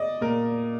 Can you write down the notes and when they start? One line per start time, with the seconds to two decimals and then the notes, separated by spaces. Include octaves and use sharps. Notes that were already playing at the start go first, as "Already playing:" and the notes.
Already playing: D5 D#5
0.21 A#2 A#4